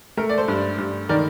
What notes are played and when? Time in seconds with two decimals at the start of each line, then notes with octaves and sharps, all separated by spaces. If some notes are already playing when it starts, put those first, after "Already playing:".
0.17 A3 A#4
0.29 D5
0.38 A4 C5
0.48 G2
0.78 G2
1.09 D#3 A#4 D5